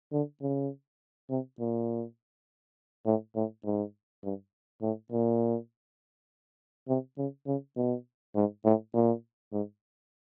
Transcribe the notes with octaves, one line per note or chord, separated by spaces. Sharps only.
D3
C#3
C3
A#2
A2
A2
G#2
G2
A2
A#2
C3
C#3
C#3
B2
G#2
A2
A#2
G#2